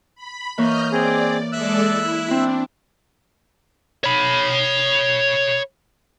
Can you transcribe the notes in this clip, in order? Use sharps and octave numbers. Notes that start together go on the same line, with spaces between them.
B5
E3 A#3 C#5 D#5 F6 G6
C4 G#4 D5
G#3 A4 D5 E5 E6 F#6
E4
C4 D4 E4
C#5 B5